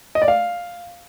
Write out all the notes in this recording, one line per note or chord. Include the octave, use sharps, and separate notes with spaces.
D#5
D5
F5